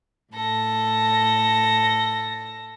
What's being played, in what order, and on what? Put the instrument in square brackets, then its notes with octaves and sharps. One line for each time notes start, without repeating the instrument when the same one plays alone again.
[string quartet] A2 A4 A#6